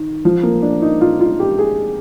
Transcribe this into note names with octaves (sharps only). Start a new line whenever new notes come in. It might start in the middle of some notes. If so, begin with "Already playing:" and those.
Already playing: D#3
F3
A#3
D4
D#4
F4
F4
G4
G#4